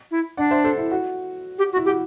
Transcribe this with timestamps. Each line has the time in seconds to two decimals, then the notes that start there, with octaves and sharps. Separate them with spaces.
0.11 E4
0.37 D4 D5 F#5
0.51 C5 E5
0.64 A4 C5
0.78 E4
0.92 F#4
1.59 G4
1.73 F#4
1.77 E4
1.85 F#4 G4